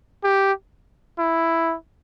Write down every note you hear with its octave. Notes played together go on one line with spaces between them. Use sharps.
G4
E4